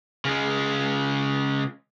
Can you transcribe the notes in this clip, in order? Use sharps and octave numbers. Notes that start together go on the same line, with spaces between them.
C#3 G#3